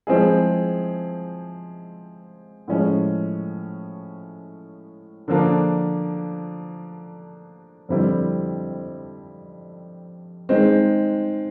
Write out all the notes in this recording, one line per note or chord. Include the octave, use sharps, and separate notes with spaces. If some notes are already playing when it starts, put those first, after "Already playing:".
F3 G#3 C4 E4 G#4
A2 F3 G#3 C#4
D3 F3 A#3 D4
F2 D3 G3 C4 E4
D#3 G#3 C4